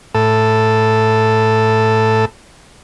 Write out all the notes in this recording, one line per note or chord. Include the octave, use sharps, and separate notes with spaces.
A2 A4